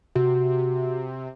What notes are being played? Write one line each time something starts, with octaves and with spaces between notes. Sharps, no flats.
C3 F#4